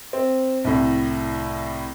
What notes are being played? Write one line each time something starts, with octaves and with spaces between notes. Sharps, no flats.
C4
C2 A2